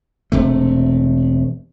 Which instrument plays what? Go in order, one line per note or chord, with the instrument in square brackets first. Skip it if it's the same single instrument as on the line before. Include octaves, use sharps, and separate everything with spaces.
[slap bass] E1 C3 A3